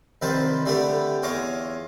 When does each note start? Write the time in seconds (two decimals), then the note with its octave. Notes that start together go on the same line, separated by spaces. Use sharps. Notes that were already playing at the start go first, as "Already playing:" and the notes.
0.22 C2 D#3 F3 B4 C5 A5
0.66 D3 G3 A3 B3 G4 A4
1.23 E2 F4 C#5 D#5 D6